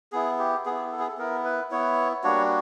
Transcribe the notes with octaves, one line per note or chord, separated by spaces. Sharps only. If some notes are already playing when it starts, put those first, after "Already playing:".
B3 E4 G#4
G4
B3 E4 G#4
A4
G#4
A4
B3 E4 A#4
B4
B3 E4 C#5
G3 A#3 D4 F#4 C#5